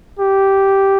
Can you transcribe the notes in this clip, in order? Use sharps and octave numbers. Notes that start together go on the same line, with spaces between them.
G4